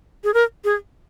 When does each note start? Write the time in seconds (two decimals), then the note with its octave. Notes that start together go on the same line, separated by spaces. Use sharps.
0.24 G#4
0.34 A#4
0.64 G#4